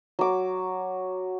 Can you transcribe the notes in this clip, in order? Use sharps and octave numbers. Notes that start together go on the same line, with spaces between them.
F#3 D6